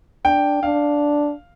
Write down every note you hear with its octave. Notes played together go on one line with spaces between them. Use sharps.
D4 G5
D4 F5